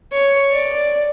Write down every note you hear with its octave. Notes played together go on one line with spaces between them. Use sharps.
C#5
D5